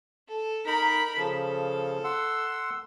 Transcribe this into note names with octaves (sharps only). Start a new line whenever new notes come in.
A4
D#4 A#4 B5
C#3 F3 A4
F#5 C6 E6